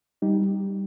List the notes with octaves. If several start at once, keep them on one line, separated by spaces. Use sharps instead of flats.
G3 D#4 G4